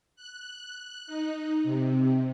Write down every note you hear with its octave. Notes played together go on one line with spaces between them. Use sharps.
F#6
D#4
C3